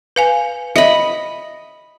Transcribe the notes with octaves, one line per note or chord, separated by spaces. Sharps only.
B4 F5 G#5
D#5 E5 B5